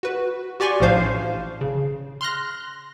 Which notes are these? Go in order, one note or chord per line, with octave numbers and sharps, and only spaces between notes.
F#4 B4
F#4 G4 D5 G#5 C6 C#6
A1 A2 F3 D4 C5 F5
C#3
C6 F6 F#6 A#6